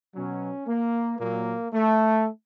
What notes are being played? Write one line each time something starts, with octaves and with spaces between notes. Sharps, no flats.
B2 F#3 C#4
A#3
A#2 F#3 A#3
A3